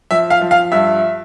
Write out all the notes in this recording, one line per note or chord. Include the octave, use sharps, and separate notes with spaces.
F3 E5
F5
F3
F5
G2 E5